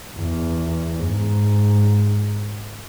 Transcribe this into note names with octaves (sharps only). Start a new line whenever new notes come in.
E2
G#2